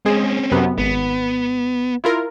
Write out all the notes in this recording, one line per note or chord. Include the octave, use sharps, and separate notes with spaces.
G#3 C4 C#4 G#4
F#2 C3 B3
G#1 B3
E4 F4 A#4